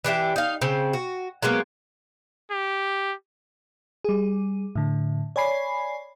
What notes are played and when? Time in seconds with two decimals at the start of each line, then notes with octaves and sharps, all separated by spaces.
0.05 E3 D4 G4 E5
0.36 D#4 F5
0.62 C#3 C4
0.93 F#4
1.42 F#3 G#3 A#3 B3
2.51 G4
4.05 G3 G#4
4.76 A2 D3
5.36 C#5 D5 G#5 B5 C7